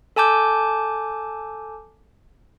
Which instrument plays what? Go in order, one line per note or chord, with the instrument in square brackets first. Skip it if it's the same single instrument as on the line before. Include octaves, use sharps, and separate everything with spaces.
[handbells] A4 G#5 A5 D6 G6